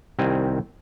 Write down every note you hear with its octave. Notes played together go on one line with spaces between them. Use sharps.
C2 D#3 C4 G#5